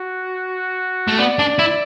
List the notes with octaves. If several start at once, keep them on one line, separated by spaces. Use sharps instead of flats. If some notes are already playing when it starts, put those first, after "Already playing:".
Already playing: F#4
A3
B3 D5
D4
E4